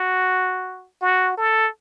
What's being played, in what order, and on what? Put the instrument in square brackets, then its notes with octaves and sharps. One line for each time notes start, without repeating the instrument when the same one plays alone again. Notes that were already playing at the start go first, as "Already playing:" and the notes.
Already playing: [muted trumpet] F#4
F#4
A4